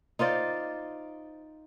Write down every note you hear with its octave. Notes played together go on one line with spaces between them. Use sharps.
D#4 F4 C5 D5